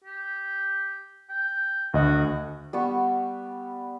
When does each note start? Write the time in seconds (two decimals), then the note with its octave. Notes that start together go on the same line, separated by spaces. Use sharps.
0.04 G4
1.30 G5
1.94 D2 F#4 D#5
2.73 G3 B3 C#6